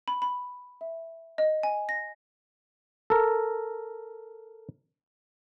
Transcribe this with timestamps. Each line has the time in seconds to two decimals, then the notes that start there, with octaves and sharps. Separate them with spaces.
0.08 B5
0.22 B5
0.81 E5
1.38 D#5
1.63 G#5
1.89 A#6
3.10 A4 A#4